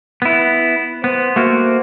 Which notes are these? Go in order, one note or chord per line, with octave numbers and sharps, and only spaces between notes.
B3 E4
B3 C5
A3 A#3 F#4